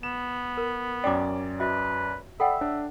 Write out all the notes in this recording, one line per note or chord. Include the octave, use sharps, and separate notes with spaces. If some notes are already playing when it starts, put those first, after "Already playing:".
B3 E7
A#4
F#2 C#4 D5 G5 D6
F#4 B4 D#5 E5
A4 D5 E5 F#5 G5 B5
D4 C#5